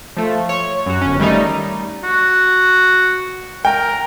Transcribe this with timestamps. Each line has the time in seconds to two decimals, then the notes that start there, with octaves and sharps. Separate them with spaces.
0.17 F3 A3
0.49 C#5
0.86 F#2 F#4
1.01 G1 C#4
1.20 D#3 G3 A3 D#4
2.03 F#4
3.65 A#4 G5